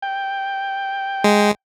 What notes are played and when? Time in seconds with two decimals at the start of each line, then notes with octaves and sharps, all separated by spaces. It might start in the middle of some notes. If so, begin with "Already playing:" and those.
0.02 G5
1.24 G#3